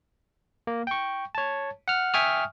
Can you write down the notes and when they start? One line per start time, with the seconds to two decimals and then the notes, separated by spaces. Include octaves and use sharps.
0.67 A#3
0.87 G5 C#6
1.35 C#5 A5
1.88 F#5 F6
2.14 E5 G5 G#5 C#6 D#6 F6